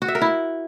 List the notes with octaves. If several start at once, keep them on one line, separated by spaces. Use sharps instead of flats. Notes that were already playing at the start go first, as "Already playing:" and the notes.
F#4
E5
A#4
E4